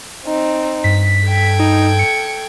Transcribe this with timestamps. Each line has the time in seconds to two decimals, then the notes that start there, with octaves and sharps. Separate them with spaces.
0.25 C4 D#4
0.84 G2 B6
1.26 A4 G5 G#6
1.60 D#4
1.99 C#7